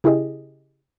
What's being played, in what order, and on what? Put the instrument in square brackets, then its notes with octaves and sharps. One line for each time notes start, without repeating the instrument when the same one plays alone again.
[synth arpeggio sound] C#3 E4 G4 G#4 D#5